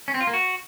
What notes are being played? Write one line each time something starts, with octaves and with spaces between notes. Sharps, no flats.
C#4
C4
F4
A#3
F#4